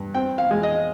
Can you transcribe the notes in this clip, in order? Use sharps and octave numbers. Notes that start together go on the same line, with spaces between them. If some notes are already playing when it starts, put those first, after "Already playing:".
Already playing: G2
C4 G5
F5
G#3
D#5